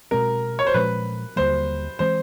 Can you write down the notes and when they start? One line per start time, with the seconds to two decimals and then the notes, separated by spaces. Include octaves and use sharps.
0.11 B2 G#3 C4 A#4
0.59 C#5
0.67 C5
0.74 A#2 F3 G#3 C#4 B4
1.36 D#2 D3 G3 A#3 C5
1.99 E3 G#3 C4 C5